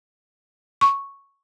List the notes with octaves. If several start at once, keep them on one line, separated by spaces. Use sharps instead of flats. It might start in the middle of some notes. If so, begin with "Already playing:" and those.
C#6